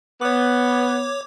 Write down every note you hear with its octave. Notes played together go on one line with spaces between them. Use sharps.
B3 C#5 D6